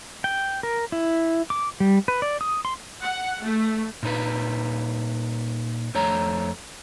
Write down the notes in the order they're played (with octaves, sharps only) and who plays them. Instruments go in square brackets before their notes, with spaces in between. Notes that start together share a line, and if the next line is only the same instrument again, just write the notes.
[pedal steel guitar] G5
A#4
E4
D6
G3
B4
D5
D#6
C6
[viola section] F#5
A3
[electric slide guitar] A#2 D#4 B4
F2 A3 C#5 A#5